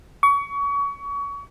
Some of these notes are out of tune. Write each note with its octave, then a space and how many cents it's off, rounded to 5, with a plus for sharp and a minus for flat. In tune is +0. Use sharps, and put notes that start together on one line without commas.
C#6 +30